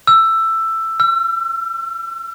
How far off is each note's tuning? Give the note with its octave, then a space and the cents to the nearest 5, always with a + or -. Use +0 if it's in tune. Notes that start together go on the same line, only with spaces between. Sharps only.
E6 +10
E6 +40